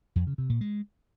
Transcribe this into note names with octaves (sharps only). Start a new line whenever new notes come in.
F2
C#3
C3
A#2
G#3